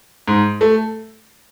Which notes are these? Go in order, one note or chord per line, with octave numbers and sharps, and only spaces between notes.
G#2
A3